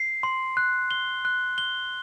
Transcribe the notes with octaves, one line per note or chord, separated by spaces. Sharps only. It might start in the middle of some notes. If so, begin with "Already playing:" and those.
Already playing: C7
C6
F#6
G7
F#6
G7